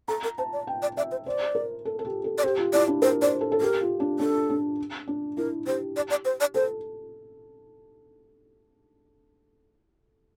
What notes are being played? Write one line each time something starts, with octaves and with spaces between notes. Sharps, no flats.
A4 A#5
A#4
C5 A5
D5
G5
D5
D5 E5
C5
C5 D5
A#4
A4
A4
G4
A4
D5
G4 C5
F4
E4 D5
D4
A#4 C5
C5 D5
A4
A4
G4 A#4
F4
D4
D4 A4
D4
D4
E4 A#4
G4 C5
D5
D5
C5
D5
A4 C5